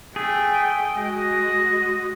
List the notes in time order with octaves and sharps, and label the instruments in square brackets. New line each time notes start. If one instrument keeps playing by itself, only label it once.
[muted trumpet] A3 [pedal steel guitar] G#4 [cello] G5
[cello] G#3 F#4 [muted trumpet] D#5